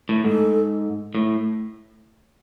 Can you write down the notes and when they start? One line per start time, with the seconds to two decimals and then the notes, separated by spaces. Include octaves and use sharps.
0.09 A2
0.24 G#2 A4
1.15 A2